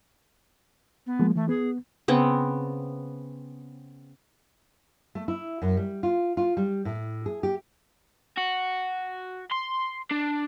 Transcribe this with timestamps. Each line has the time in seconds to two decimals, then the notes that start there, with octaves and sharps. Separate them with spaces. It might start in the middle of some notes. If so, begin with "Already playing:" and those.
1.07 B3
1.19 F3 G#3 A#3
1.36 E3 A3
1.49 B3 G#4
2.08 C#3 B3 C4
5.15 A3
5.28 E4
5.62 F#2
5.77 G3
6.03 F4
6.37 F4
6.57 G3
6.85 A2
7.26 G#4
7.43 G4
8.37 F#4
9.51 C6
10.11 D4